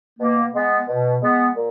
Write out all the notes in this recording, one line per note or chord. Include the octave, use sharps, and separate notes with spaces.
B2 A#3
G#3 B3
B2
G#3 B3
A#2